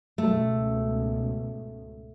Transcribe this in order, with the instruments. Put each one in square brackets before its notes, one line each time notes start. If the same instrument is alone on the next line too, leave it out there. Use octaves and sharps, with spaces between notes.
[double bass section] C#2 G#2 B2 [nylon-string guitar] A3